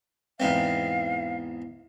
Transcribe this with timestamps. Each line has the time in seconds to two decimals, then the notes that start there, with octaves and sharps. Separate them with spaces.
0.40 E2 G#2 C4 F5